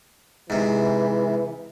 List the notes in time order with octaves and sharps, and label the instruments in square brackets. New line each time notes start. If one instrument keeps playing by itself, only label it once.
[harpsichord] G#2 C3 [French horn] E3